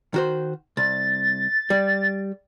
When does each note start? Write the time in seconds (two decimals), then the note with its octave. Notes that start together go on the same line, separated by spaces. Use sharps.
0.14 D#3 F#4 C5
0.77 C2 A6
1.70 G3